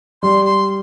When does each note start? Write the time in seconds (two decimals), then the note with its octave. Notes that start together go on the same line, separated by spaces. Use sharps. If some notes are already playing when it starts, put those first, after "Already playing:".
0.23 G3 C6
0.45 C6